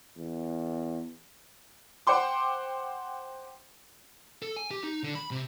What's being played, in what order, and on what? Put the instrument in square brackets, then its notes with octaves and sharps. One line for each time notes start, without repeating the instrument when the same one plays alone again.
[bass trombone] E2
[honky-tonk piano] C5 F#5 G5 C6 D6
[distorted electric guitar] A4
G#5
G4
D#4
D3
B5
C3